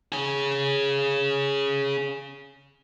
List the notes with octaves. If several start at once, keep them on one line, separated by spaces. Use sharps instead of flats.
C#4 G#4